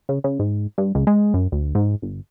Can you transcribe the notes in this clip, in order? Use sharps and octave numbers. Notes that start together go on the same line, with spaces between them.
C#3
C#3
G#2
G2
C#2
G#3
F#2
D2
G#2
G1